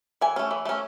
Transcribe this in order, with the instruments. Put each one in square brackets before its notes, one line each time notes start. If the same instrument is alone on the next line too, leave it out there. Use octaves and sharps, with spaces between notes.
[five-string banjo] E3 G#5
A3 C#4
E3
A3 C#4